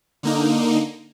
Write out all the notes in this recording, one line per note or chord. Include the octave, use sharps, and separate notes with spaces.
D3 A#3 D#4